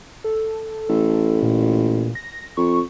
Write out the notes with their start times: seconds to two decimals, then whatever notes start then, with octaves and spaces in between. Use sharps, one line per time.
0.24 A4
0.89 A1 A4
1.43 A#2
2.15 A#6
2.57 F2 C#6